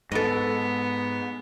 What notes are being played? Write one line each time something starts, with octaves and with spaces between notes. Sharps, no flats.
G#2 B3 A4 D#5